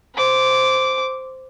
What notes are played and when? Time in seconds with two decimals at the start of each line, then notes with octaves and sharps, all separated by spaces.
0.15 C5 D6